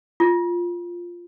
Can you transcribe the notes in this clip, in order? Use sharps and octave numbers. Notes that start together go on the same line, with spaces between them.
F4